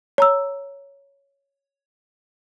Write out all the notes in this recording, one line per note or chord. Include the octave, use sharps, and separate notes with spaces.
C#5 A#5 E6